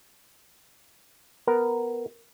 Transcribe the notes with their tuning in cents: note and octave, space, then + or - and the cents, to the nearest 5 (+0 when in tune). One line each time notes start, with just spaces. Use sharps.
B3 +0 A#4 +0